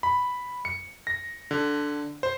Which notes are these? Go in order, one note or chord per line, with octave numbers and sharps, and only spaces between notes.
B5
C#7
A#6
D3
C5